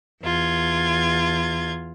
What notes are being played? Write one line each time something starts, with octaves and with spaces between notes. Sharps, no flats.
E2 F4 G#6